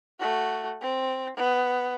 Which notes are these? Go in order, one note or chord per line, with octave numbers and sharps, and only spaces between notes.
A3 F#4
C4
B3